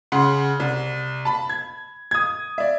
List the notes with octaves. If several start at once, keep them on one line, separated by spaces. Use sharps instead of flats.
C#3 F#5 C6
C2
A5 B5
G#6
D#6 G#6
D5 E5